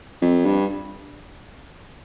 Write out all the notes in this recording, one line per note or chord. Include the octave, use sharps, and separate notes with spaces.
F2
G2